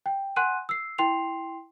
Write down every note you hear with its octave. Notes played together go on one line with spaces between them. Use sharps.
G5
F#5 G#5 C6 F#6 D#7
E6 C7
E4 G5 C6 C7 F7